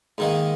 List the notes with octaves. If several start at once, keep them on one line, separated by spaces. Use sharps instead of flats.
G#2 D#3 A#3